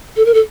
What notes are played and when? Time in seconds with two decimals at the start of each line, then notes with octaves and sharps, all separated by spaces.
0.16 A4
0.26 A#4
0.34 A4